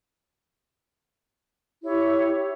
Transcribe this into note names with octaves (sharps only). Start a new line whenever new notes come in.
E4 G4 C#5